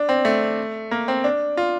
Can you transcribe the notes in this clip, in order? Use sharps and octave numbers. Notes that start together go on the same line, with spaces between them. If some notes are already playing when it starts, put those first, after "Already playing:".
Already playing: D4
C4
A3
A#3
C4
D4
F4